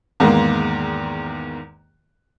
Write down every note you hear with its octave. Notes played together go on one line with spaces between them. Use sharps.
E2 G#2 D#3 G#3 A#3